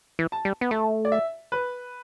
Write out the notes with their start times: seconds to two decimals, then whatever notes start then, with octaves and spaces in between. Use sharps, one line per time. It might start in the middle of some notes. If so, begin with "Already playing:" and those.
0.19 E3
0.32 A5
0.45 G3
0.61 B3
0.71 A3 A5
1.05 D5
1.12 E5
1.52 B4